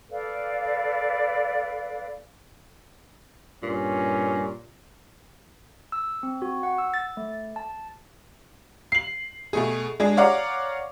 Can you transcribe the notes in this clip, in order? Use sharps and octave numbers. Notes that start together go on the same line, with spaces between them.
A4 B4 D5 F5
G2 A#2 C#4
E6
C4
F#4
F#5
E6
A6
A3
A5
C7 F#7
B2 A3 G#4
G#3 D4 G#4
C#5 D5 F5 F#5 A#5 D6